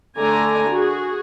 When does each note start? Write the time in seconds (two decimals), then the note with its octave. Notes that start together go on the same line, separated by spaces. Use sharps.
0.18 D3 A3 D5 G#5 A#5
0.71 F#4 G#4